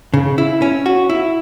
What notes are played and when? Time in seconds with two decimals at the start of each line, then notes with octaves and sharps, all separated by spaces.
0.14 C#3
0.38 E4
0.62 C#4
0.86 F#4
1.10 E4